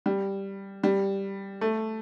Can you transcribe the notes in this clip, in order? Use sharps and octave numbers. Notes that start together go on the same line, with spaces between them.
G3
G3
A3